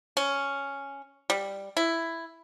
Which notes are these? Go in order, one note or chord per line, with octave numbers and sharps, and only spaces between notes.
C#4
G3
E4